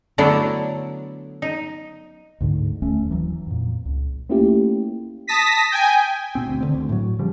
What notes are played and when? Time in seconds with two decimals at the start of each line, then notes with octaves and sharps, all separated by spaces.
0.18 D3 F#3 A3 B3 D4 E4
1.42 D#4
2.41 D2 G#2 D3
2.82 E1 D#2 A3 C#4
3.11 E3 F#3
3.47 F2 A#2
3.85 C#2
4.30 A3 A#3 C#4 E4 F4 G4
5.27 A5 D#6 A#6 B6
5.72 G5 G#5
6.35 B2 C4
6.47 D2
6.60 D3 C4
6.74 D2
6.89 A2 F#3
7.19 C#3 F3 G3